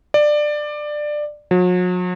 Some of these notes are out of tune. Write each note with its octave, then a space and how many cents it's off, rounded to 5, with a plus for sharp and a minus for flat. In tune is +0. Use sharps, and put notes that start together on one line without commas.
D5 +15
F#3 -40